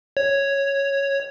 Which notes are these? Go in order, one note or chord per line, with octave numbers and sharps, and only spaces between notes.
C#5